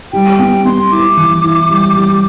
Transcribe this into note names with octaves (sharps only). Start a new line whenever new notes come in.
G3 G5
B3 G5
B3 C6
E4 D6
E3
E4
G3
G3